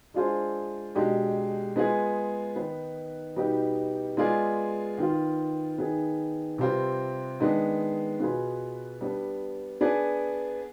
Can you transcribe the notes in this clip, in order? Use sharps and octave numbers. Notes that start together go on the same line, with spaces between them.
G#3 D4 F4 G#4 C5
B2 G#3 D4 G4
G#3 B3 F4 G#4
D#3 B3 D#4 B4
B2 G3 B3 D#4 G4
G#3 B3 F4 G#4 D5
D#3 B3 F4
D#3 B3 D#4 G#4
C3 G3 C4 F4 B4
D#3 G#3 B3 D4
B2 B3 F4 G#4 B4
G3 B3 D4
B3 D4 G#4 D5